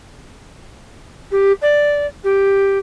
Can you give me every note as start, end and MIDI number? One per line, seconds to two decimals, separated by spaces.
1.31 1.52 67
1.61 2.06 74
2.23 2.77 67